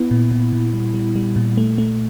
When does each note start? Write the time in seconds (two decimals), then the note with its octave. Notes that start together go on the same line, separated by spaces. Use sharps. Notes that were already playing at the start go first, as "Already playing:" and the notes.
Already playing: B3 E4
0.11 A#2
0.31 A#2
0.53 A#2
0.74 G3
0.94 G3
1.16 G3
1.36 A#2
1.57 A3
1.78 A3